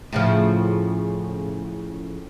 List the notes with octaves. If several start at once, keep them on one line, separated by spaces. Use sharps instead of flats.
A2 C#3 F3